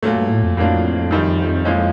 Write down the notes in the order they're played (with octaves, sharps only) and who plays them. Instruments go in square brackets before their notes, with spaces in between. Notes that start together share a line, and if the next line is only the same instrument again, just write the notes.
[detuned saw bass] G2 [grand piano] A#2 F#3 A3
[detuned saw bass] G2
A2
F2
[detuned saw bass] F2 [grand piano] A2 F#3 A#3 D4 F4
[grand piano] F#2 D#3 G3
A#2 F3 G#3 C#4 E4